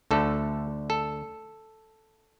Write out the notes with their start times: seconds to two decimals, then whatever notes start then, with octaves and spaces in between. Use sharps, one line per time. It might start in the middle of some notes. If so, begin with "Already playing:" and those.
0.11 D2 D3 A3 A4
0.90 A4